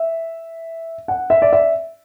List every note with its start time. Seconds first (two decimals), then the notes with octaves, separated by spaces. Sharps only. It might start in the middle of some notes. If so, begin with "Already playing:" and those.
Already playing: E5
1.08 F#5
1.30 E5
1.42 D5
1.53 E5